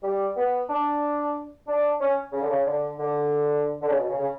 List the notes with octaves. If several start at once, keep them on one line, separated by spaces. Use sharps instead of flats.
G3
B3
D4
D4
C#4
C#3
D3
C#3
D3
D3
D3
C#3
B2
C#3
C#3